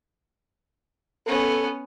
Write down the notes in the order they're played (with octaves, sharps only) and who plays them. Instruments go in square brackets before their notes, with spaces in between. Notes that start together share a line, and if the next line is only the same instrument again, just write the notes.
[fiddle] B3 C#4 [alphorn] A4